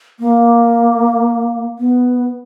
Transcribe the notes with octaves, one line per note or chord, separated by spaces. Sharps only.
A#3
B3